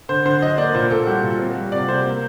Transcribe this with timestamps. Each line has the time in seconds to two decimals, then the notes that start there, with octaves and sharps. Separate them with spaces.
0.09 D3 C5
0.25 D3 C5
0.41 F#3 D#5
0.58 A#3 D5
0.75 A#2 C5
0.90 A#2 A4
1.07 G3 F#4
1.23 A#2
1.39 C4
1.56 G3
1.72 C3 D5
1.89 C3 C5
2.05 A#3